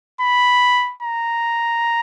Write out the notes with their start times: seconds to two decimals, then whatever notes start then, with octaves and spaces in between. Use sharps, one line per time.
0.21 B5
1.03 A#5